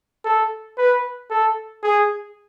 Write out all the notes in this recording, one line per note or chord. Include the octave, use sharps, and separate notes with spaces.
A4
B4
A4
G#4